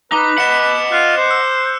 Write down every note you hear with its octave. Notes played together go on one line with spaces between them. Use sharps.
D#4 B4 D6
D#5 F#5 C#7 E7
F4 F#6
C5
E6